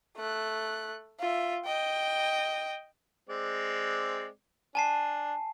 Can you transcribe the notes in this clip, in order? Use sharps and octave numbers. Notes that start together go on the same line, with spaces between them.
A3 F#6
F4 E5
D#5 G5
G#3 C4 D5
D4 G#5 A5 C7